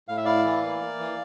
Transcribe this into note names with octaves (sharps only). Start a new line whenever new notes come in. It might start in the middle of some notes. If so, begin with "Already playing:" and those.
A2 F5
E5
E4 D5 F5
E3
A#3
A#3
E3